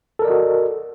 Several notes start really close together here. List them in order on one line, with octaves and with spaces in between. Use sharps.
A4 A#4 D5 D#5 F#4